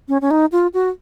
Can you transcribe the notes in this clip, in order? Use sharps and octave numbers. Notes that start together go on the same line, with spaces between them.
C#4
C#4
D#4
F4
F#4